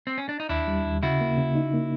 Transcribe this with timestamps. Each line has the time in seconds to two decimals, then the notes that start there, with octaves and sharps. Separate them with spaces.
0.07 C4
0.18 C#4
0.29 D4
0.40 D#4
0.49 D#2 D4 E4
0.68 G3
0.85 D#2
1.03 C#3 E4 F#4
1.21 A#3
1.37 C#3
1.55 D#4
1.74 A#3